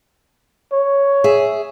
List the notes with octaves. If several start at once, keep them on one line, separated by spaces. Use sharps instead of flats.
C#5
G#4 E5